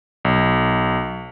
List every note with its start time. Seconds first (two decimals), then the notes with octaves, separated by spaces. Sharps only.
0.25 B1